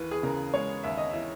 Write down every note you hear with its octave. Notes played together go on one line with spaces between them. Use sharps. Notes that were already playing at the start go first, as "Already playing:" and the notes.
Already playing: D#2 E3 B4
G#4
C#3 A#4
G#3 C#5
D#2 E5
D#5
E3 E5